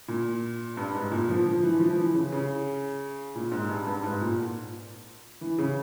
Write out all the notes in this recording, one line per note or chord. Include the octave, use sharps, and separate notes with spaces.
A#2
G2
G#2
A#2
F3
F3
E3
F3
F3
E3
C#3
C#3
A#2
G#2
G2
G2
G#2
A#2
E3
C#3